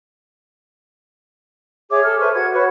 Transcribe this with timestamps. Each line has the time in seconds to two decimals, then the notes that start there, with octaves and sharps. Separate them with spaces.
1.90 G#4 C#5 E5 D6
2.04 A4 F6
2.20 B4 C5 E5 C#6
2.35 F#4 G#6
2.53 F#4 B4 C#5 C#6